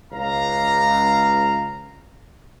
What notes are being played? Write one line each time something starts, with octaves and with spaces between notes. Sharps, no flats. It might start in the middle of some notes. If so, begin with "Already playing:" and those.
C#2 F5 A#5